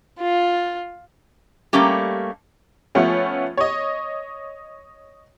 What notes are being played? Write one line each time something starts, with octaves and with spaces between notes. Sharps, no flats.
F4
G3 A3 A#3 C#4 G4
F3 A3 B3 C#4 F4
C#5 D#5